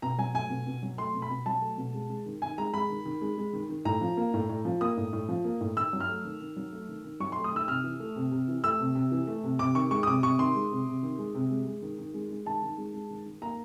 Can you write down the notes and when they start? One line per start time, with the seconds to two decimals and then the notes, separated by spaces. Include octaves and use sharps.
0.02 B2 A#5
0.18 F#3 G#5
0.34 A3 G#5
0.50 B2
0.67 B2
0.83 F#3
0.98 A3 C6
1.14 B2
1.22 B5
1.30 B2
1.46 F#3 A5
1.62 A3
1.78 B2
1.94 G#3
2.10 G#3
2.26 D#3
2.42 D#3 G#5
2.58 G#3 A#5
2.74 G#3 B5
2.90 D#3
3.05 D#3
3.22 G#3
3.37 G#3
3.53 D#3
3.69 D#3
3.85 A2 A#5
4.01 F3
4.17 A#3
4.34 A2
4.49 A2
4.65 F3
4.81 A#3 D#6
4.97 A2
5.13 A2
5.29 F3
5.45 A#3
5.61 A2
5.77 D#3 E6
5.93 F#3
6.00 F6
6.09 A3
6.25 D#3
6.41 D#3
6.56 F#3
6.72 A3
6.89 D#3
7.04 D#3
7.20 F#3 C#6
7.32 C6
7.36 A3
7.44 D#6
7.52 D#3 E6
7.68 C3 F6
7.84 E3
8.00 A3
8.16 C3
8.32 C3
8.48 E3
8.64 A3 E6
8.80 C3
8.95 C3
9.12 E3
9.27 A3
9.44 C3
9.59 C3 D6
9.75 D#3 C#6
9.91 G#3 C#6
10.03 D#6
10.07 C3 D6
10.23 C3 C#6
10.39 D#3 C6
10.55 G#3
10.71 C3
10.87 C3
11.03 D#3
11.19 G#3
11.35 C3
11.51 G#3
11.67 G#3
11.82 D#3
11.98 D#3
12.14 G#3
12.30 G#3
12.46 D#3 A5
12.62 D#3
12.78 G#3
12.94 G#3
13.10 D#3
13.26 D#3
13.42 A#3 A#5